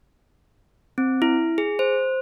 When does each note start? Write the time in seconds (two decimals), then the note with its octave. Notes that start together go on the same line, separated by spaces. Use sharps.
0.98 C4
1.22 E4
1.58 G#4
1.79 C5